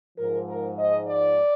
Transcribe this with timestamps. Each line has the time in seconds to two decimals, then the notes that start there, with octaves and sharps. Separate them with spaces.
0.17 G#2 F3 A#4
0.48 A#4
0.78 D#5
1.09 D5